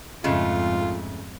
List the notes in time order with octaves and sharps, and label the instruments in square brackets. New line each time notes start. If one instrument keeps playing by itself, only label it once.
[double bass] F2 G#2 [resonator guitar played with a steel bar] C#3 G#3 A3 [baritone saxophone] F4